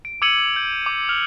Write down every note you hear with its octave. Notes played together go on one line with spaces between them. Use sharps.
D7
D6 E6 G#6 C#7 D#7 F#7
G6
D6
F6 F7